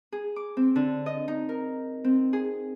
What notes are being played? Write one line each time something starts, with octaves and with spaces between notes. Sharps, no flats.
G#4
D6
C4
D3
D#5
D#4
A#4
C4
G#4